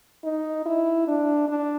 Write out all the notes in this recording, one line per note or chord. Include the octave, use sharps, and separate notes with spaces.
D#4
E4
D4
D4